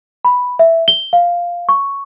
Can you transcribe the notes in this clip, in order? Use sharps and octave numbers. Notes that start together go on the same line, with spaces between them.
B5
E5
G7
F5
C#6